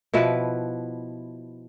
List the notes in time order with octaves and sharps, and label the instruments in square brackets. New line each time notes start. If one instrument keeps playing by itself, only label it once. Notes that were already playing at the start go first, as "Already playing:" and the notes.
[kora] B2 F3 E4 B4